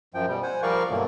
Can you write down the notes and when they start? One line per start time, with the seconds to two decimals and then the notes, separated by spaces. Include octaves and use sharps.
0.14 F#2 F3 G5
0.28 B2 G3
0.43 C5 F#5 G#5
0.63 F3 G3 A#4 D5 F5 C#6
0.90 G2 B2 D3 E3 F#3 A#3